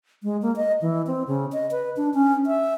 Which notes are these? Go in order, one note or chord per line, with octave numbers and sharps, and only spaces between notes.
G#3
A#3
D#5
E3
C4
C#3
D#5
B4
D4
C#4
E5